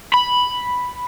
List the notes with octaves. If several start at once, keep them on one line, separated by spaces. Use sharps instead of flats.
B5